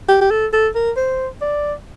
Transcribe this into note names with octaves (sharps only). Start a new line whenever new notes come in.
G4
G4
A4
A4
A#4
C5
D5